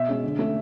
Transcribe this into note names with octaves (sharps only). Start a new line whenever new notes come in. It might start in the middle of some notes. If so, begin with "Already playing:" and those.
Already playing: B2 E5
G#3 C#4
D3
A3 C#4